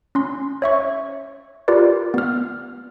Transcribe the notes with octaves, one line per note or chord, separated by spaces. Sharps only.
C#4 C6
C#5 E5 C#6
F4 G4 A#4 B4 D5
B3 F6